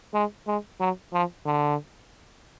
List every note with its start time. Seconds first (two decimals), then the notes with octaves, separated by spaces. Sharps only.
0.14 G#3
0.47 G#3
0.80 F#3
1.13 F3
1.46 D3